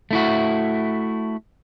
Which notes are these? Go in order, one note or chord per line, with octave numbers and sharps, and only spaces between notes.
A3 E4 F#4